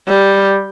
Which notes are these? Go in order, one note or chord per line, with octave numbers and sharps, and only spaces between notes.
G3